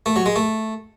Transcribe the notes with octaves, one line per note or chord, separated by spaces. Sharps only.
A3
F#3
G#3
A3